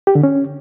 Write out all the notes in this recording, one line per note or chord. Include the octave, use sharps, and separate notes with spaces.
G4
D3
C#4